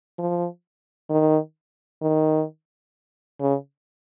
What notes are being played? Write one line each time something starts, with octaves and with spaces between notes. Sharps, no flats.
F3
D#3
D#3
C#3